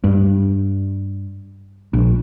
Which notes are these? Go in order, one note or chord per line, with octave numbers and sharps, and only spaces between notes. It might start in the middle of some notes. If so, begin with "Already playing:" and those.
G2
A#1